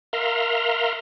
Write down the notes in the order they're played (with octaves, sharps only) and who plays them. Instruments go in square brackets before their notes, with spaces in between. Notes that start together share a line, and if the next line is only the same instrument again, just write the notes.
[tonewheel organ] A#4 E5 F5 A#5 C6